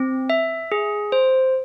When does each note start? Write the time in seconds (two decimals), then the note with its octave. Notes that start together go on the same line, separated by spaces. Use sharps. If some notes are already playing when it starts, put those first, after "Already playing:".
Already playing: C4
0.30 E5
0.72 G#4
1.12 C5